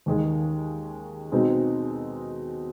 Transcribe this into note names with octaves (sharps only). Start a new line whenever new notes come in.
D#2 D#3 G#3
B2 G#3 C4 D#4 F#4